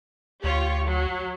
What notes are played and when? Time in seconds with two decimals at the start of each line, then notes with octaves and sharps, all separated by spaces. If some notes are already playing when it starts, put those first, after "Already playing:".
0.44 D2 F4 G4 C#5
0.86 F#3